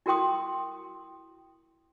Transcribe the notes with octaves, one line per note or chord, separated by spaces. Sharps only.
E4 F#4 A#4 G5 C6 D#6